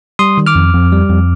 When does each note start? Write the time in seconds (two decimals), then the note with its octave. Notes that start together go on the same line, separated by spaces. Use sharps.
0.19 G3 C6 D#6
0.38 D#3
0.47 D6 F6
0.55 F2
0.74 F2
0.92 G3
1.10 F2